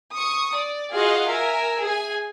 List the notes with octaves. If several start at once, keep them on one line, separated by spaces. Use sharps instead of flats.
C#6 D#6
D5
F4 F#4 G#4 D#5 F5 F#5
A#4 E5 G#5
G#4 G#5